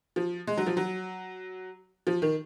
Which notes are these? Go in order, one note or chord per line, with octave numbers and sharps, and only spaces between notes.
F3
G#3
F#3
F3
F#3
F3
D#3